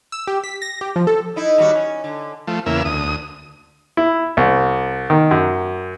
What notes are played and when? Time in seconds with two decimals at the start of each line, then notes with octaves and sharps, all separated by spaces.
0.12 E6
0.27 G4
0.44 B6
0.62 A#6
0.81 G4
0.96 F3
1.07 A4
1.36 D#4 E4
1.58 D#2 G3 F#4
1.75 C#4
2.04 D3
2.47 F3 A3
2.66 E2 C#3 A#3 E5
2.85 D2 D#6
3.97 E4
4.37 C2
5.10 D#3
5.31 F#2